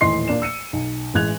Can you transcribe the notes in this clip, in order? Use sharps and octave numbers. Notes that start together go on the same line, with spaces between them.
D#1 A2 E3 D#5 C6 C7
A#2 A#3 D4 E7
E6 C#7 D#7
B1
A1 E3 G#3 F#6 G#6 F7